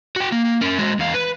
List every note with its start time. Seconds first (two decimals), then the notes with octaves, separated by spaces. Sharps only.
0.16 F#4 G5
0.32 A#3
0.61 C#4 A#4
0.79 G#3 F#4
0.99 E2 F5
1.14 B4